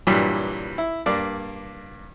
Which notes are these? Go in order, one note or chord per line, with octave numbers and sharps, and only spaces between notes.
G2 A#2 E3 F#3 G3
E4
G2 A#3 D5